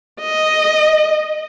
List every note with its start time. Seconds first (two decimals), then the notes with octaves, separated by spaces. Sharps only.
0.21 D#5